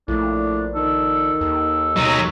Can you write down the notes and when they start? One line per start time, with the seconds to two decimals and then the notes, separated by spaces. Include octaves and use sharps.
0.08 A#1 A2 D4
0.75 D#3 A4
1.41 D#2 A4
1.96 F#3 D#4